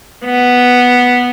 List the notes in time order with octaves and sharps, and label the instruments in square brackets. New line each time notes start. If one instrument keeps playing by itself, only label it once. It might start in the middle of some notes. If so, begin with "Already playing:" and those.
[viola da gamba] B3